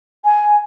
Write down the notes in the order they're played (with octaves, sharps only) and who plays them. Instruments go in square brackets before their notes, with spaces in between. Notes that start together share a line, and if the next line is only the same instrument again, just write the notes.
[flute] G#5